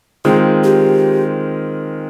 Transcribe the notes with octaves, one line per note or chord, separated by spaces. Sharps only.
D#3 G#3 C4 F4 G#4
G4